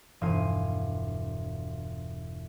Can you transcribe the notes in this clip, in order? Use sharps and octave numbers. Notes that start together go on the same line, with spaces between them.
E1 G2 F4 G#5 D#7